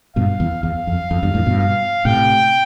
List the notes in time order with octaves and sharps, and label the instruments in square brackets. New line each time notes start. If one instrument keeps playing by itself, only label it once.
[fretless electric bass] G2 B2 [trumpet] F5
[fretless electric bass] E2
[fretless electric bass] E2 [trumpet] F5
[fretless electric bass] F2
F2
E2 G2
F2 A2
G2 B2
[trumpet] F5
[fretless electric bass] A2 C3 [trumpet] G5